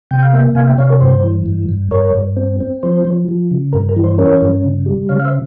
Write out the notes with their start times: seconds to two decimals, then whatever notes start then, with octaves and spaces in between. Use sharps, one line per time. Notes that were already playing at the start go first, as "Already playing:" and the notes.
0.11 C3 G5
0.22 F5
0.33 A#3 E5 G5
0.55 C3 F5 G#5
0.67 E5 G5
0.78 C3 C#5 F5
0.89 A#4 C#5
1.00 G2 C5
1.23 E3
1.46 G2
1.69 G2
1.91 G2 A#4 C#5
2.14 G2
2.37 C4
2.60 C4
2.83 F3 C5
3.05 F3
3.28 F3
3.51 C#3
3.73 G2 A#4
3.89 A#4
3.97 E3
4.04 C5
4.18 C#4 A#4 C#5
4.42 G2
4.64 C#3
4.86 G3
5.09 C#3 C#5 F5
5.20 F5
5.25 C5 E5